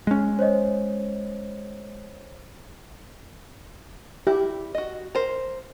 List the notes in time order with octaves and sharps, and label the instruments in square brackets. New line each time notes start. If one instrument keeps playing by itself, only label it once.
[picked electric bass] G#3 C#4
[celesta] C5 C#5 D#5
[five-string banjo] E4 [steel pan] G4
[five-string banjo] F#4 D#5
A#4 C5